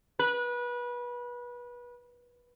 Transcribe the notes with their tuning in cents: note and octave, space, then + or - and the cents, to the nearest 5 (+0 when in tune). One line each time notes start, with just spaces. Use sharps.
B4 -25